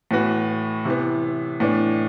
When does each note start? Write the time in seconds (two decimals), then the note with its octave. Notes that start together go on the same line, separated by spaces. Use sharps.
0.11 A2 E3 B3 F#4 B4
0.85 C3 E3 B3
1.60 A2 E3 B3 D4